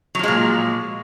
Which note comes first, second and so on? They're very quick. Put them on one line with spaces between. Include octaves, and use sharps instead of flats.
F#3 F3 G#3 A#2